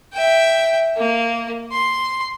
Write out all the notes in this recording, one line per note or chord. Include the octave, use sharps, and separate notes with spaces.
E5 G5
A#3
C6